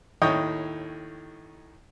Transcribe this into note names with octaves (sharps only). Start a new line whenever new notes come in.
D#2 A2 C#5 D#5 G5 D#6